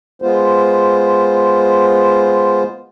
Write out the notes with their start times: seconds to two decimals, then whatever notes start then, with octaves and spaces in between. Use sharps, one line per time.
0.22 G#3 B3 F4 C5